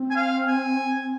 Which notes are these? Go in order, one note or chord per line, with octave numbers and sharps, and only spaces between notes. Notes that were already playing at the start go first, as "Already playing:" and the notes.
Already playing: C4
G#5
F5
G#5